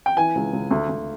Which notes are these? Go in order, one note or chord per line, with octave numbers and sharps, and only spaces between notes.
G5
E3 G#5
C#2
C#2
D2
D2